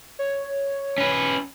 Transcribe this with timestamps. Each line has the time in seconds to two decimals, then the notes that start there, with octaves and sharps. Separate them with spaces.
0.19 C#5
0.98 C#4 B4